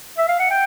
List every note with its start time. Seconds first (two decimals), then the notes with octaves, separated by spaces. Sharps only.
0.18 E5
0.28 F5
0.39 F#5
0.50 G5